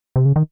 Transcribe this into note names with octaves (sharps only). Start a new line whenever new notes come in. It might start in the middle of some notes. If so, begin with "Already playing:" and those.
C3
C#3
D#3